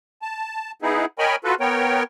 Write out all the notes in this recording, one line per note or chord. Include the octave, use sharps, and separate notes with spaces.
A5
B3 D#4 E4 G#4
A#4 C#5 D#5 G5 G#5 B5
F4 F#4 A4 B4
B3 A#4 C#5 G5